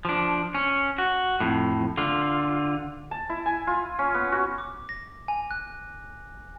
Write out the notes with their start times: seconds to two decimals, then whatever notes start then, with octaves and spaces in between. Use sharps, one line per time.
0.05 F3 D4
0.55 C#4
0.98 F#4
1.40 F2 A2
1.98 D3 F4
3.11 A5
3.30 E4
3.46 G#5
3.67 F4
3.99 C#4
4.14 B3
4.32 F#4
4.58 D6
4.89 A#6
5.28 G#5
5.51 F#6